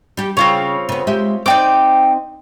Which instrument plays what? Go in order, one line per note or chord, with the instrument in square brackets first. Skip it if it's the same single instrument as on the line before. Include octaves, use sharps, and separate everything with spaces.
[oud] G3 G4
[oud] C#3 [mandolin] C4 F4 C#5
[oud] C#3 B3
G#3 G4 E5
[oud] C4 D#4 D5 [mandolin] G5 D6